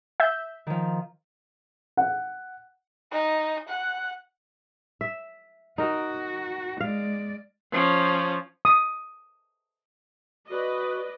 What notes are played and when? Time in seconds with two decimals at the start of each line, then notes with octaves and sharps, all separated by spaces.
0.20 E5 G6
0.67 D#3 F3
1.97 F#5
3.12 D#4
3.70 F#5
5.01 E5
5.78 D#4 F#4 A#4
6.81 G#3 D5 F5
7.72 F3 C#4
8.65 D#6
10.50 F#4 B4 D5 D#5